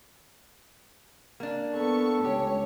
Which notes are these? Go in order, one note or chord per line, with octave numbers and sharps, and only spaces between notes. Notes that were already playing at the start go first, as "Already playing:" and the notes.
A#3 D4
B3 A4 C#6
C#2 G4 C#5